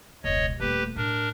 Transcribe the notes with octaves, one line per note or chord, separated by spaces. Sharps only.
E1 C#2 C#5 D#5
D#1 A3 G4 B4
A2 D4 A#4